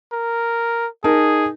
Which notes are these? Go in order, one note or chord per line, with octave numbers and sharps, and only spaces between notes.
A#4
D#4 G#4 A#4 A5